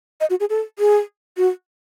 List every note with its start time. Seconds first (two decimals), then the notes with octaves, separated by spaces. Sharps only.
0.21 D#5
0.30 F#4
0.40 G#4
0.50 A4
0.79 G#4
1.37 F#4